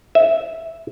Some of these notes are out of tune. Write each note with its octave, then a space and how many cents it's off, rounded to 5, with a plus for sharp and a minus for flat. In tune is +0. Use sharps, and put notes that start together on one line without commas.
E5 -5